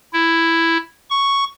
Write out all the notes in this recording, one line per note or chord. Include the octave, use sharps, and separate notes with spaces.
E4
C#6